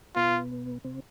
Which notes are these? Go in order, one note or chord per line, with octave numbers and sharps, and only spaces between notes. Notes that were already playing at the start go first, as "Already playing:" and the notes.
B2 B3 F4
C3 C4